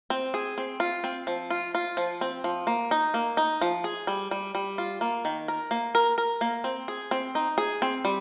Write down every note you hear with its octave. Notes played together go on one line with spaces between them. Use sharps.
C4
G#4
C4
F4
C4
F3
F4
F4
F3
C4
F3
A#3
D#4
A#3
D#4
F3
G#4
G3
G3
G3
F4
A#3
D#3
A#4
A#3
A#4
A#4
A#3
C4
G#4
C4
D#4
G#4
C4
G3